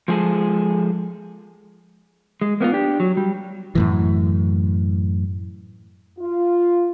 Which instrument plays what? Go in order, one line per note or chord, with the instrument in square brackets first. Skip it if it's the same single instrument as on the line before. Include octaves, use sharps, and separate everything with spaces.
[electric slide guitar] F3 G#3 G#4 A4
G#3
A#3 B3 E4 F4
D4 G4
F#3
G3
[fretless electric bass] F#2 A2 E3
[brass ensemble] F4